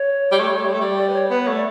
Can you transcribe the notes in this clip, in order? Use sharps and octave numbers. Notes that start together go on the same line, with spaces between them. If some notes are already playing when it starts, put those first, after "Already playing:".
Already playing: C#5
G3
A3
G3
A3
G3
A3
G3 D5
D5
B4
C#5
B3 B4
A3 C#5
D5